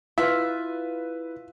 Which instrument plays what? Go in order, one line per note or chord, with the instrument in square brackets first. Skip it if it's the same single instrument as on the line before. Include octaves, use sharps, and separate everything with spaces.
[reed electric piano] E4 [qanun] F4 [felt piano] B4 [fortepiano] E5